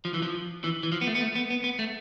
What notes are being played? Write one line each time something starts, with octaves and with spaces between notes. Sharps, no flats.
F3
E3
F3
E3
E3
F3
B3
A3
B3
A3
B3
B3
B3
A3